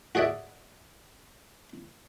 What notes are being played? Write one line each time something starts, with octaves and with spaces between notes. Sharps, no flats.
F#4 G#4 C#5 D5 E5